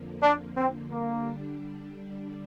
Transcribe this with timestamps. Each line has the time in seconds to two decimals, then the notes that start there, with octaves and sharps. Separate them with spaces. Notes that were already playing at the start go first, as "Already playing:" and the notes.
Already playing: F2 D3 F3 A#3
0.23 D4
0.57 C4
0.90 D3 G3 A#3 D4